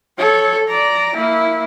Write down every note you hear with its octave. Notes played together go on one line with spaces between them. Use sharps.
A4 C#5
D5 A#5
A#3 E4